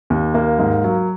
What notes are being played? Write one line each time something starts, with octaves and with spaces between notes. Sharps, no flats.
D#2
A#3
G#2
F#3